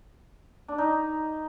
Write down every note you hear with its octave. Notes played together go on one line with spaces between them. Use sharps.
D4
D#4